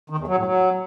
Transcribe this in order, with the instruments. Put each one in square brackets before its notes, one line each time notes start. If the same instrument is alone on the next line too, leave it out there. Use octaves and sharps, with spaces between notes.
[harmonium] D#3
E2
F#3
A2
F#3